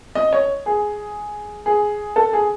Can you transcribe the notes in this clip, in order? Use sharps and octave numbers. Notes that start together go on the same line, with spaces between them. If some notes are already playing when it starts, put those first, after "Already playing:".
D#5
C#5
G#4
G#4
A4
G#4